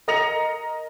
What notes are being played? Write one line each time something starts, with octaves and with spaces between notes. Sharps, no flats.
A#4 D#5 A#5 A#6 C#7 F7